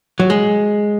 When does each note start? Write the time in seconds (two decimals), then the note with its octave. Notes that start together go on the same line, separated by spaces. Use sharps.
0.20 F#3
0.30 G#3